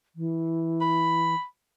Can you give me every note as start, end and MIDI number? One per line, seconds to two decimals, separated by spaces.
0.16 1.34 52
0.81 1.44 83